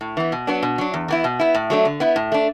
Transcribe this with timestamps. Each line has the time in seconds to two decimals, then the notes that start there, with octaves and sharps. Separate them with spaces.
0.01 A2
0.17 E3 B3
0.32 B2
0.47 F#3 B3 D4
0.63 B2
0.78 F#3 D4
0.94 E2
1.08 E3 B3 E4
1.24 B2
1.40 B3 E4
1.55 A2
1.70 F#3 A3 D4
1.85 D3
2.00 B3 E4
2.16 A2
2.32 A3 D4